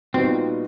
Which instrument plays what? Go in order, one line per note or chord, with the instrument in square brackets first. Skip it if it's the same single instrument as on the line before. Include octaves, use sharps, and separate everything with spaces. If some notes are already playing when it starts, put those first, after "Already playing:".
[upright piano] A#2 G3 B3 D#4 F#4 [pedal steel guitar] C4